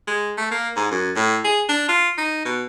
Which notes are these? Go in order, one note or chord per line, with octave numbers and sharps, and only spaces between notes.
G#3
A3
A#3
G#2
F#2
A2
G#4
D4
F4
D#4
B2